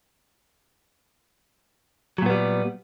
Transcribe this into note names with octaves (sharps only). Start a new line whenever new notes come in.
A#2 F#3 G3 B3